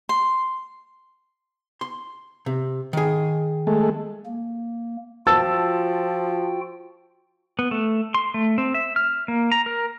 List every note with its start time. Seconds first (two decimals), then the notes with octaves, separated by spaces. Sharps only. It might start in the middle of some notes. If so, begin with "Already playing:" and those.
0.09 C6
1.81 C6
2.46 C3
2.93 D#3 G#4
3.67 G#3 A3
4.26 A#3
5.27 F3 F4 F#4 G5 A5 E6 A6
7.59 B3
7.71 A3
8.14 C6
8.34 A3
8.58 C4
8.74 E5
8.96 F6
9.28 A#3
9.52 A#5
9.66 A#4